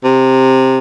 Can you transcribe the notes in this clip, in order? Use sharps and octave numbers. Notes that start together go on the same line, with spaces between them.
C3